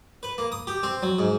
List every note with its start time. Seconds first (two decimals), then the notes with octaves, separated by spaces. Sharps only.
0.23 B4
0.38 A#3
0.52 D#6
0.67 G4
0.83 C4
1.02 F#3
1.19 G#2